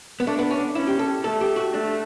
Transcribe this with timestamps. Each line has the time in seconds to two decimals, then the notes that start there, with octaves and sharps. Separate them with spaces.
0.20 B3
0.26 A3 D4
0.39 B3
0.50 C#4
0.75 C#4 E4
0.87 G4
0.99 A4
1.24 A3 A4
1.41 G4
1.56 F#4
1.73 A3 D4